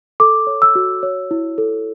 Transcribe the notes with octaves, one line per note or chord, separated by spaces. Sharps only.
A4 D6
C#5
E6
F#4
C#5
E4
A4